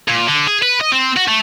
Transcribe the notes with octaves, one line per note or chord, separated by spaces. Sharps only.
A#2
D3
G#4
B4
D#5
C4
F#4
A3